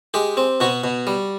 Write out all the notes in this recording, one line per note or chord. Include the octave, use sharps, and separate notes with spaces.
G#3 G4
C4
B2 F#4
B2
G3